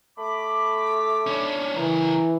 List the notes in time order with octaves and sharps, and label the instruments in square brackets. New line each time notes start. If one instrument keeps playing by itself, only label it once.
[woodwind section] A3 B5 D6
[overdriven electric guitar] C#4 D4
[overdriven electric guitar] C#3 A#4 [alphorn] E3